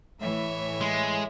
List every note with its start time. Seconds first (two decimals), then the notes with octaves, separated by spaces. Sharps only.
0.21 A2 E3 C#5 E5
0.81 G#3